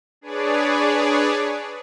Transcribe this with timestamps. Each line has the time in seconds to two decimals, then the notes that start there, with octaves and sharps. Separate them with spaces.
0.21 D4 G#4 B4 C#5 D5